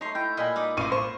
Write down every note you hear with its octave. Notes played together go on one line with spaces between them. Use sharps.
A3 D#4 C#5 C6
E4 G5
A#2 D#5 G5 G#5 B5
D#4 D6 D#6
A1 F5 C#6 D6 D#7
C5 C#6